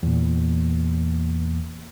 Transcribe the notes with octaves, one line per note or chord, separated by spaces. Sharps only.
E2 A#2